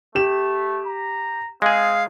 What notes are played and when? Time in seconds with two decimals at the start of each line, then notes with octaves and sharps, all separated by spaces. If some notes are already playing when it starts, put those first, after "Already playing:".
0.15 A3 G4 E7
0.87 A#5
1.62 G#3 C4 G#4 F5